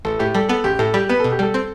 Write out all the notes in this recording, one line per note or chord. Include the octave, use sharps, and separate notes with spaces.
A1 A4
A2 G4
G3 A4
B3 A4
A1 G4
A2 A4
G3 G4
B3 B4
B2 A4
G4
G3 A4
C4